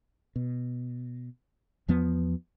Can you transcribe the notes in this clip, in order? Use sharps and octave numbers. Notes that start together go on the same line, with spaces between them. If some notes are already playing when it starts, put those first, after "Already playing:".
B2
E2 F3 B3